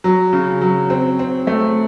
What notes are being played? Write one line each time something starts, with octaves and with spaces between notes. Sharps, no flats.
F#3
C#3
F#3
C4
C4
A3